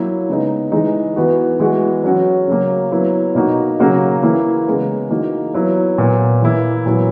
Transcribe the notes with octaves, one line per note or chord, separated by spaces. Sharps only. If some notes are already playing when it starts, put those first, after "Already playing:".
Already playing: F#3 A#3 E4
C#3 G#3 B3 D#4
E3 G#3 D#4
E3 B3 F#4
E3 G#3 B3 F#4
F#3 C#4 F#4
C#3 F#3 A#3
F#3 B3 E4
B2 A#3 D#4 F#4
C#3 F#3 A#3 C#4 F#4
E3 A#3 E4
C#3 G#3 B3
E3 A#3 D#4 F#4
F#3 B3 E4
A#2 F#3 B3
E3 A#3 E4
A#2 F#3 B3 E4